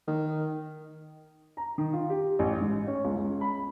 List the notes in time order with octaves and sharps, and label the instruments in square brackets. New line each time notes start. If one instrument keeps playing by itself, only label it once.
[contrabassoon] D#3
[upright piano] A#5
D#3
F4
G4
A1
G#2
C#4
C#2
C#2
B5